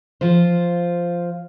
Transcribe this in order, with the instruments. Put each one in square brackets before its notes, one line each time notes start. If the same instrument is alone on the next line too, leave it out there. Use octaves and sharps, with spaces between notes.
[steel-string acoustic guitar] F3 F4 C5